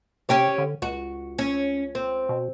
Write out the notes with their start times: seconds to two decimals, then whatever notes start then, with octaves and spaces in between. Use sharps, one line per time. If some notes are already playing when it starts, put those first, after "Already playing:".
0.29 C3 C#4 G4 C#5
0.58 D3
0.82 C#2 F#4
1.39 C#4
1.95 C4
2.29 B2